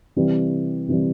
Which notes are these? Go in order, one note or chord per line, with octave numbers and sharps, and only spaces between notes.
C3 E3 G3
C3 E3 G3